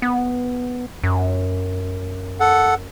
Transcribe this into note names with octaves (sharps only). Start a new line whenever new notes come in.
B3
F#2
A4 F#5